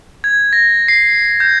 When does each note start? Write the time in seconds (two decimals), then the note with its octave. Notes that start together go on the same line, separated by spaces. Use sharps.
0.24 G#6
0.53 A#6
0.88 C7
1.40 G6